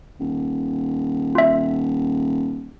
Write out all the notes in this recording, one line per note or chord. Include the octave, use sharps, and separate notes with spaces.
D#1
F4 E5